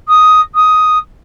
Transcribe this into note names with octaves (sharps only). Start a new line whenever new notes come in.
D#6
D#6